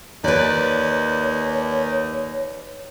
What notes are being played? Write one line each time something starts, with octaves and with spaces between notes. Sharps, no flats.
D#2 B4 C#5 D5